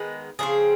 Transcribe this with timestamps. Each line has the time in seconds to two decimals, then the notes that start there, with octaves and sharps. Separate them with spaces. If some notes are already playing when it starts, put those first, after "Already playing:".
Already playing: D#3 G#3 B3
0.39 C#3 F3 A3 C4 G#4